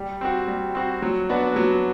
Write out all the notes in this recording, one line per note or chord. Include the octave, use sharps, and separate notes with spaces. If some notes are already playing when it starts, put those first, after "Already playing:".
Already playing: G3
C4 F#4
G3
C4 F#4
F#3
B3 D4 F#4
F#3